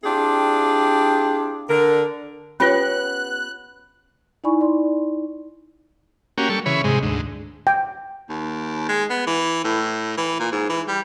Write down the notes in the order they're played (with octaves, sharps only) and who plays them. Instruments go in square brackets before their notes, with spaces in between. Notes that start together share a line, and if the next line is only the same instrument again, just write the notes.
[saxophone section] C4 D4 E4 F4 G4 G#4
D3 A#4
[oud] B3 G4 C#5 [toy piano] C#4 F4 [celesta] B4 B5 [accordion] F#6
[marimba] D#4 E4 D5 G#5 B5 C#6
D5 C6
[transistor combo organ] A#3 C#4 F#4 G4
G3 A4 C#6
C#3 E3 C#5 B5
G#2 C3 G#3
D2 G#2
[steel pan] G5
[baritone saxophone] D#2
G#3
B3
E3
A2
E3
A#2
G#2
E3
G3